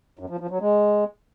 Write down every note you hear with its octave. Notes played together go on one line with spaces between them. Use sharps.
F#2
F3
F3
F#3
G#3